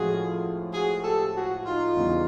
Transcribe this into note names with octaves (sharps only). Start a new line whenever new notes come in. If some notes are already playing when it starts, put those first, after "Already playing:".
Already playing: A2 F3 G#3 C#4 F4 F#4 G#4
F#4 G#4
G4 A4
F#4 G#4
D#4 F4
E2 C#3 E3 G3 B3